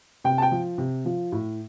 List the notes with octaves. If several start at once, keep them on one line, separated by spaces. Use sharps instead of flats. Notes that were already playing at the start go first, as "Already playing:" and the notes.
C3 G5
A5
G5
F3
C3
F3
A2